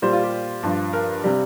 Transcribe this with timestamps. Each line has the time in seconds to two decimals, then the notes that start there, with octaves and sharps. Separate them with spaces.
0.02 A#2 G3 C5
0.13 F4
0.23 G4
0.63 G2 F3
0.93 A#4
1.24 C3 G3